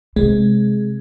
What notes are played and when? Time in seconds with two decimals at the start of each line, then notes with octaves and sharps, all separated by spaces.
0.16 C3 G#3